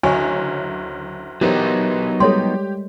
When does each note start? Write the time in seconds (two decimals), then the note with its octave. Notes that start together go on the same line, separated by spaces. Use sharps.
0.03 F#1 D2 F#4 C#5 D#5 G#5
1.41 E3 F#3 B3 D#4 G4 A#4 C5
2.20 G3 G#3 G4 A4 C#5 C6